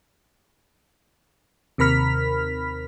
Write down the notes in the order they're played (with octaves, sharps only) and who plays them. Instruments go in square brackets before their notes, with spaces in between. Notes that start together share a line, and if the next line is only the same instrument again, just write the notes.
[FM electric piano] D#2 C3 A#4 B5 F6 B6